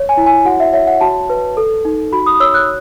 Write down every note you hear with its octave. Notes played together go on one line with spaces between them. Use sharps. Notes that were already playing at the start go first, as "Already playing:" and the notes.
Already playing: C#5
G#5
E4
G#5
F#4 F#5
E5
C#5 E5
F#5
F#4 A5
B4
A4
D#4
F#4 B5
D#6
C#5 E6
F#6